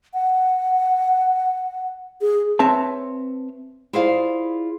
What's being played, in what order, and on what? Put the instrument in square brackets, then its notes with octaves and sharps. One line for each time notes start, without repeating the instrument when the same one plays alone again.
[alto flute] F#5
G#4
[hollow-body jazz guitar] C4 B4 C#5 E5 A5
[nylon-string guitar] E4 F4 G#4 C5 D5 F5